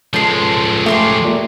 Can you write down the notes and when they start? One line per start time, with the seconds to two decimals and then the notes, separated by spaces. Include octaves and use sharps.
0.14 C#2 F3 G#3 A4 C6
0.86 A3 G4 G#4 C6
1.24 A#2